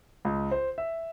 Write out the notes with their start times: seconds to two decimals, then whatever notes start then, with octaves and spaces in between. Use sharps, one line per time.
0.25 C#2
0.51 C5
0.78 E5